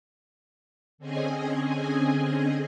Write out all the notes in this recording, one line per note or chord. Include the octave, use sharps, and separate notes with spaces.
D3 C4 C#4 G#4 D#5 G#5